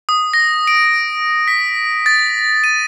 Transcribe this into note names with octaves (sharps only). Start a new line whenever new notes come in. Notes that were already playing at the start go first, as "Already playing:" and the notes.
D#6
A#6
D7
B6
A6
D#7